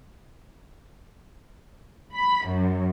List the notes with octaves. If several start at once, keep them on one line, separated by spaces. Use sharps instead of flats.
B5
F#2